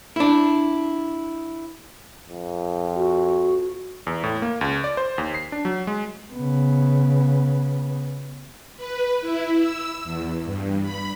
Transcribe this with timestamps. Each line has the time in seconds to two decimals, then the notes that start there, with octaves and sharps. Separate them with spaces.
0.16 D4 E4
2.29 F2
2.95 F#4
4.07 E2
4.24 A2
4.42 A#3
4.61 C#2
4.84 D5
4.97 C5
5.18 D#2
5.34 C7
5.52 D4
5.65 F#3
5.87 G#3
6.32 C#3 B3
8.77 B4
9.21 E4
9.58 E6
10.04 E2
10.45 G2
10.83 B5